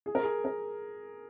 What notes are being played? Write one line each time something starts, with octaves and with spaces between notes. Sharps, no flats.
G#4
A#4
G#4
A#4